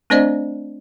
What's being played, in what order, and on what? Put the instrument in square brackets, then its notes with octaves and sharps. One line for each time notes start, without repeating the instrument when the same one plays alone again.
[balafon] A3 C4 D4 C5 D5 D#5